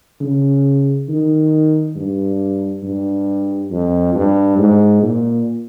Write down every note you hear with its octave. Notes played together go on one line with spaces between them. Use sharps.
C#3
D#3
G2
G2
F2
G2
G#2
A#2